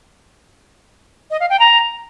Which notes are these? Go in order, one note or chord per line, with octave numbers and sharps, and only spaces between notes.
D#5
F5
G5
A#5